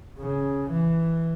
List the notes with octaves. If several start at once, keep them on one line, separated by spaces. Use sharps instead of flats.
C#3
E3